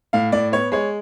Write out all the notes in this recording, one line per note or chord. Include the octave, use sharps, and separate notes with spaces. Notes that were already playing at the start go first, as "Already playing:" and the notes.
A2 F5
A2 D5
B3 C#5
G#3 C#5